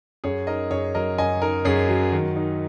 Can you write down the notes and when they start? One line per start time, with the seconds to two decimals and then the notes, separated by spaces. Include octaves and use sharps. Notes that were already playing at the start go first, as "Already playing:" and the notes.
0.24 F#2 G#4 C#5
0.47 D#4 A#4 D#5
0.71 F#2 G#4 C#5
0.95 F#3 A#4 D#5
1.18 F#2 D#5 G#5
1.42 D#4 A#4
1.65 F#2 G#4 C#5
1.89 F#3
2.12 D#3
2.36 D#4